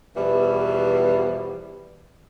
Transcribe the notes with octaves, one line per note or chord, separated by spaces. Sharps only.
E2 B2 E3 F3 G3